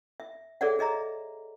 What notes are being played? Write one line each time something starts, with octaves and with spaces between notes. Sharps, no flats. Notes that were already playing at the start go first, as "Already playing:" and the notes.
E5
G#4 A4 C#5 D5 E5 F#5
G#4 D#5 E5 A#5